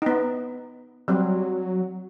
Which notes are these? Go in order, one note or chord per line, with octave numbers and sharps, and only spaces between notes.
B3 D#4
F#3 G3 C4